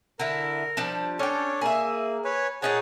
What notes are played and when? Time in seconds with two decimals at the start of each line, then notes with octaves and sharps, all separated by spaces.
0.19 D3 E4 A#4
0.77 F3 G3 D4
1.19 C#4 D4 A4 C#5 G5
1.61 A#3 G#4 E5
2.25 B4 C#5 G#5
2.62 A#2 D#4 G#4 C#5 F#5 A5